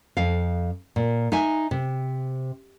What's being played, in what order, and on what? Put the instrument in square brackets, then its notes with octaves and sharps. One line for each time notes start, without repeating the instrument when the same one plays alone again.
[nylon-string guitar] F2 F5
A#2
D#4 E5 G#5
C3